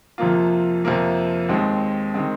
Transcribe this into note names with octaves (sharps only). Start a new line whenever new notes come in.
F2 C3 F3 A#3 F4
F2 C3 F3 A#3 F4
D#2 D#3 G#3 C4
D#3 G#3 C4